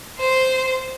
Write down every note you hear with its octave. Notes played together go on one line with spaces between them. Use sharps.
C5 C6